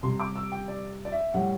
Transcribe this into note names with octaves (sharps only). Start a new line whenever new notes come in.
C3 G3 C6
D6
E6
G5
D5
D5
E5
A2 G3 F#5